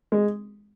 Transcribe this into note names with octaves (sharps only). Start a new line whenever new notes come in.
G#3